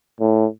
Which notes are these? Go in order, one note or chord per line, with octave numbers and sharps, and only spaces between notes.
A2